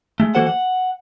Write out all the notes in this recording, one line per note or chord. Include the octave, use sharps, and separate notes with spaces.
G#3 A3
E3 A#3 F#4 A4 C5 F#5
F#5